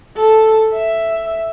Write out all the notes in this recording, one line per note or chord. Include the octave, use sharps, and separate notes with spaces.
A4
E5